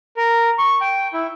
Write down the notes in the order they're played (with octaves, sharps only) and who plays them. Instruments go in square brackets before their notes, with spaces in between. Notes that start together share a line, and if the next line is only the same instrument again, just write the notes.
[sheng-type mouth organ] A#4
C#6
G5
E4